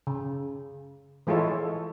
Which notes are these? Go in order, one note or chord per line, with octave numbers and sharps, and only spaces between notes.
C#3
E3 G#3 E4 F4 A4 C#5